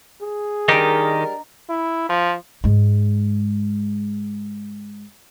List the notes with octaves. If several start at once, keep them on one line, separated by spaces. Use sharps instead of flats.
G#4
D#3 G3 D4 D#4 G4 A#4 D#5 A#5
E4
F3
G#2 G#3